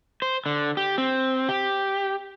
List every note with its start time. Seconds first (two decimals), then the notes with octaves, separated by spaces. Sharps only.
0.22 C5
0.46 D3
0.77 G4
0.98 C4
1.49 G4